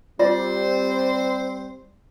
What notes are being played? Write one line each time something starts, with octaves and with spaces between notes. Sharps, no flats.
G3 C4 F4 C5 D5